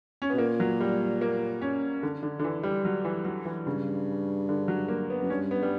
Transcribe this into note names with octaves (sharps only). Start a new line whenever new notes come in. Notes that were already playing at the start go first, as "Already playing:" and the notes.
C#4
B2 B3
A#2 A#3
F#3
G3
A#3
C#4
D3
D3
D3
E3
G3
F#3
E3
F#3
E3
G2 C#3
D3
F#3
A#3
B3
F#2
G2 C#4
B3
G3